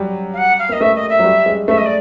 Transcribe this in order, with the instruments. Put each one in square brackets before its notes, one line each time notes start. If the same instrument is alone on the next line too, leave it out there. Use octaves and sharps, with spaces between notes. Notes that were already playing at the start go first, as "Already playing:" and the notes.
Already playing: [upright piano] F#3 G3
[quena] F5
F#5
F5
[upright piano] A#3 [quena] D#5
[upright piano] A3 [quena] E5
[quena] D#5
E5
[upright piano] F#3
G3
G#3
[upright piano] A3 [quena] E5
[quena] D#5
D5